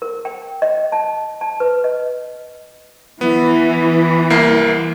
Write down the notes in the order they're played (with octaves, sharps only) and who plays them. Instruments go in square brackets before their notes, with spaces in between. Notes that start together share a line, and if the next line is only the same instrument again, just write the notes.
[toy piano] A#4
G5
D#5
A5
A5
B4
D#5
[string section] E3 [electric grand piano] B3
[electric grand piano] C2 A#3 C7